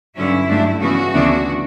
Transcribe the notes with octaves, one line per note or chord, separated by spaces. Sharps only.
G2 D3 F#3 C#4 E4
G2 F#3 A3 D4
C#3 E3 B3 F#4
D2 C#3 E3 B3 D4